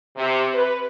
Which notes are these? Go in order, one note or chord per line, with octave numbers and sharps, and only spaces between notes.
C3
B4